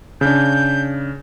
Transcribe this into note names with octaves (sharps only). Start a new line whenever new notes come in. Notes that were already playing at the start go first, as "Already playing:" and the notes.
C#3 D4 G6